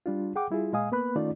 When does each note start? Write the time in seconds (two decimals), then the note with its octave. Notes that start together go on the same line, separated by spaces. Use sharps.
0.06 G3 D4 F4
0.36 G#4 F#5 G5 D6
0.50 G3 E4 F4 G#4
0.73 A#2 G#3 D#5 F5 G#5 D#6
0.92 A#3 B3 B4 B5 F#6
1.16 D#3 A3 C#4 D#4 F4 D5